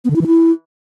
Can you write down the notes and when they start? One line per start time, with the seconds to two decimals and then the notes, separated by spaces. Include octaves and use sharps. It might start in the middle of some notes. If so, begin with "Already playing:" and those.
0.05 B3
0.10 D3
0.16 E4
0.21 E3
0.27 E4